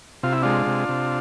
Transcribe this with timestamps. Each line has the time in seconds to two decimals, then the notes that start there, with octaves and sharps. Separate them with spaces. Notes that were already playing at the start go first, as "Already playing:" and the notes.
0.23 C3 F4
0.32 E4
0.42 G#3 D4 F4
0.67 C3
0.89 C3